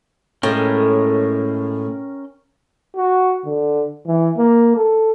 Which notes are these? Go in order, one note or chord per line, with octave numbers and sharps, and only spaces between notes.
A2 G#3 C#4 A#4 G5
F#4
D3
E3
A#3
A4